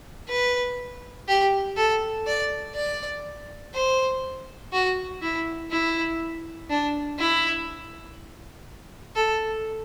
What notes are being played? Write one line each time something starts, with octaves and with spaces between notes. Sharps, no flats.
B4
G4
A4
D5
D5
C5
F#4
E4
E4
D4
E4
A4